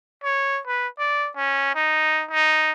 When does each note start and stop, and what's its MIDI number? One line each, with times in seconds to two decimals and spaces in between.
0.24 0.60 73
0.67 0.88 71
0.99 1.29 74
1.36 1.75 61
1.75 2.24 63
2.31 2.72 63